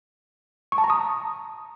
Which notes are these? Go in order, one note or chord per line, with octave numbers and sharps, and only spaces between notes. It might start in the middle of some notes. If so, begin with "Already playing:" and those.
C#6
A5
A#5
D#6